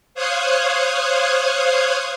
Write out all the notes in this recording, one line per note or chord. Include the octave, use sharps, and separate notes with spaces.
C5 C#5 F5 D#6 F#6 G#6